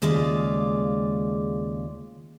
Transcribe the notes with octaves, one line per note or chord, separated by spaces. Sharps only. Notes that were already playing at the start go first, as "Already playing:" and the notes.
D#2 C#3 G#3 F4 D5 F5